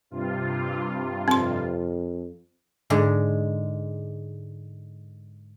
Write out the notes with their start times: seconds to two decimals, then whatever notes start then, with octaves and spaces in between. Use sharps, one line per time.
0.11 G2 C3 F4
1.28 F2 C4 C6
2.90 G#2 D3 G#3